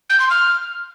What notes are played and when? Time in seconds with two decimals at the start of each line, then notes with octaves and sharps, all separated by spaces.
0.10 G6
0.20 C6
0.30 F6